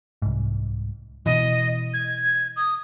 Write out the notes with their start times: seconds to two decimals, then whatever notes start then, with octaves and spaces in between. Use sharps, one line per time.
0.22 C2 G#2
1.26 B2 E3 D#5
1.94 G#6
2.56 D#6